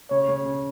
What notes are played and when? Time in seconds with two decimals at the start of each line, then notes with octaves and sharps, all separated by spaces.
0.10 C#3 C#5
0.28 C#3
0.45 C#3